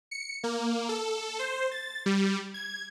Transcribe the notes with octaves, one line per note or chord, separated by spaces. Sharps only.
C#7
A#3
A4
C5
A6
G3
G#6